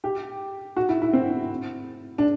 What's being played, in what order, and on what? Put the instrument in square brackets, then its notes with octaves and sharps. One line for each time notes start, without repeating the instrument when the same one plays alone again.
[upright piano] G4
F#4
E4
E4
C4
D4